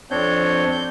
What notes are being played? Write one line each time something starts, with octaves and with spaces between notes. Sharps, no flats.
F2 C4 D4 C#5 G6
G6